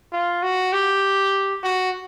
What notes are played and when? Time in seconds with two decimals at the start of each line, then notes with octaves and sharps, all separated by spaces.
0.12 F4
0.42 F#4
0.73 G4
1.63 F#4